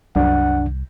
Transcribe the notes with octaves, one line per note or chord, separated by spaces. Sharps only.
C2 F#2 D4 F#5